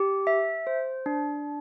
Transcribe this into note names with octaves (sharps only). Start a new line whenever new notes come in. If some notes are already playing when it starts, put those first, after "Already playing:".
Already playing: G4
E5
C5
D4